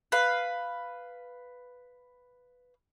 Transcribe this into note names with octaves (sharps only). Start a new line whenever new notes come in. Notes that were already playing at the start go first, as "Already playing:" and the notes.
B4 F5